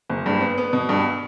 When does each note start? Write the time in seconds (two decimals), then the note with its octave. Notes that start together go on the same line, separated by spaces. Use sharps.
0.09 F#1
0.26 G2
0.41 B3
0.58 B3
0.73 B2
0.89 G2